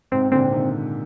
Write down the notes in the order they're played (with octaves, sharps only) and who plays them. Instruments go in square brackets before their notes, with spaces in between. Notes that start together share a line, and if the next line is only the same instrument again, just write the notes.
[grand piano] G#2 C3 [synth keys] C4
[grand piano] A#2 D3 [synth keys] C4
[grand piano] C3 D#3